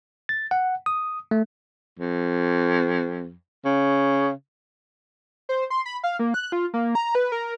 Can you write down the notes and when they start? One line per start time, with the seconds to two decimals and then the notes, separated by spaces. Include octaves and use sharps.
0.29 A6
0.51 F#5
0.86 D#6
1.31 A3
1.99 F2
3.65 C#3
5.49 C5
5.70 C6
5.86 B5
6.04 F5
6.19 A#3
6.34 F#6
6.52 F4
6.74 A#3
6.95 A#5
7.15 B4
7.32 A#4